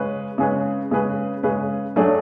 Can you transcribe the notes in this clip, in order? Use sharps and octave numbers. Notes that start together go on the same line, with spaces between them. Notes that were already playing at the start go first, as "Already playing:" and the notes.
Already playing: C#3 G#3 C#4 G#4 B4
C#3 G#3 C#4 G#4 B4
C#3 G#3 C#4 G#4 B4
C#3 G#3 C#4 G#4 B4
F#3 A3 D4 G#4